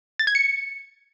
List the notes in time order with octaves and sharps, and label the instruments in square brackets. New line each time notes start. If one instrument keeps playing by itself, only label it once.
[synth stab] A6
G#6
C#7